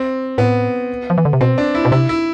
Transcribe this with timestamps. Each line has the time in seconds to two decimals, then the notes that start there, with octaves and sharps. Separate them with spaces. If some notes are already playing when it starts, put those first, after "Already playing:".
Already playing: C4
0.38 A2 B3
1.10 F3
1.18 E3
1.25 D3
1.33 C3
1.41 B2 C4
1.58 D4
1.75 E4
1.85 B2
1.92 C3 E4
2.09 E4